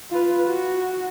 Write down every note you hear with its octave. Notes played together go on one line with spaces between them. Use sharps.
F4 B4
F#4